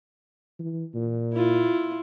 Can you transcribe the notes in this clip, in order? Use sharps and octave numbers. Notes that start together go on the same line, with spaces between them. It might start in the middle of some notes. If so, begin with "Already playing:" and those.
E3
A#2
E4 F4